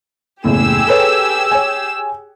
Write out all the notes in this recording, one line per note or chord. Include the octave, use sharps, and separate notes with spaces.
F#1 E2 A2 G4 G#4 E6
A4 B4 C#5
C#5 G#5